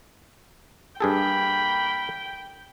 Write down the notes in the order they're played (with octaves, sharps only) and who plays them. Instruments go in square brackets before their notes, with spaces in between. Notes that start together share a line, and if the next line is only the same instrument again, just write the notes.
[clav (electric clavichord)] G2 G#4 A4 [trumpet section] A#3 B5 [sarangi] G5